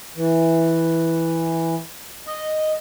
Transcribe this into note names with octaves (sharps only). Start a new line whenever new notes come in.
E3
D#5